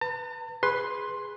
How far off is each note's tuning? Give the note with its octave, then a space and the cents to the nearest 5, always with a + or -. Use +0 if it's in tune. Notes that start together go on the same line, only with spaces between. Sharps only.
B4 +0 A5 +45
G#4 -10 B4 +0 C6 +10